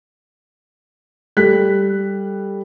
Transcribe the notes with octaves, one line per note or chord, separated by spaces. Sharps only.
G3 A4 F#6 B6